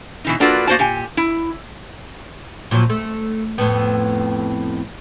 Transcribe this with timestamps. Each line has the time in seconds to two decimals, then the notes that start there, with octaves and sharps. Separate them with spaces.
0.25 B2 E3 D#4
0.40 A#3 D4 F4 F#4 A4 B4
0.67 A#3 F#4 C5 D5 A5
0.79 A#2 G4 G#5
1.17 E4
2.71 A#2 F3 F#3
2.90 A3
3.58 F2 A2 B3